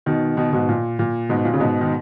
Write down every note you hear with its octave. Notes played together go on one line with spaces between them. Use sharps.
B2 D#3
B2 D#3
G#2 B2
A#2
A#2
G#2 B2
A#2
C#3
G#2 B2
D#3